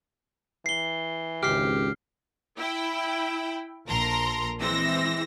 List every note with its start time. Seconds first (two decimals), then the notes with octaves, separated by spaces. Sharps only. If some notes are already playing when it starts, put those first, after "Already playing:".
0.66 E3 C7 G7
1.43 G#1 C#2 G4 F6 C7
2.58 E4 G5 B5
3.87 A#1 A4 A#4 A#5 C6 A#6
4.59 E3 G#3 C4 E6 A#6